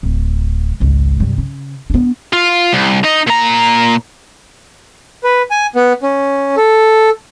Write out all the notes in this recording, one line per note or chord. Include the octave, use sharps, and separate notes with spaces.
D1
G#1 C#2
C2 G2
C#3
B3 D4
F4
C2
D#4 D#5
A#2 A#5
B4
G#5
B3
C#4
A4